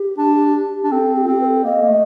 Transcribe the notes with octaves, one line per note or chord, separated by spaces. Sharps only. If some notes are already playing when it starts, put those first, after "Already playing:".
Already playing: G4
D4
D4
C4 A4
G4
F4
C4
G4
B4
A4
A#3 D#5
A#3
A3